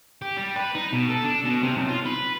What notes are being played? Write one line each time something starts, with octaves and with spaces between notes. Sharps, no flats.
G4
G3
B4
D#4
B2
A4
D4
B2
C3
B1
F4
B4